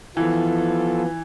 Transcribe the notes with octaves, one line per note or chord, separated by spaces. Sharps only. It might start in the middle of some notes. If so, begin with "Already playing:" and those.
E3 F3 B3 F4 A4